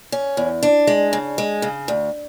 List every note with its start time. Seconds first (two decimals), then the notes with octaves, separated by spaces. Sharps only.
0.12 C#4
0.37 E2
0.63 D4
0.87 G#3
1.13 C#3
1.38 G#3
1.62 C#3
1.88 D2